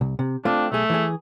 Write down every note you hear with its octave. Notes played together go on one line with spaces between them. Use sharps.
C2
C3
A3 C4 D4 F4
B1 A3 G#4
E3 G#4